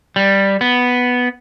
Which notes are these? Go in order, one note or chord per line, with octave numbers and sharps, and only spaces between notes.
G3
B3